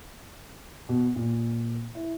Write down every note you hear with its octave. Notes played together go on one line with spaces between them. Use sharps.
B2
A#2
E4